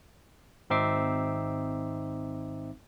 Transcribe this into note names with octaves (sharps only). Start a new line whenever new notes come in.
G#1 C4 D#4 E5 D6 C7